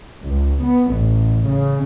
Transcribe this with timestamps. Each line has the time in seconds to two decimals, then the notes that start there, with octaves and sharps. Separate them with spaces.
0.23 C#2
0.62 B3
0.96 A1
1.49 C#3